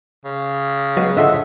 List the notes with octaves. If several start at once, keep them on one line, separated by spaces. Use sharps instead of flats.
C#3
F#3 G#3 B3
D3 F3 A3 D#5 E5 F#5